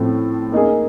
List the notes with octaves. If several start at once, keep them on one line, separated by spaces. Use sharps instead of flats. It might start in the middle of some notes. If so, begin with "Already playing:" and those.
Already playing: A2 F3 A3 C4
A#3 D#4 G#4